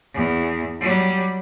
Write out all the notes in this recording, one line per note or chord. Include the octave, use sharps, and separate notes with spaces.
E2
F#3 G3